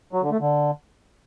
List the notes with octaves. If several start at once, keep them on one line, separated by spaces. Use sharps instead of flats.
F#3
D3
A3
D3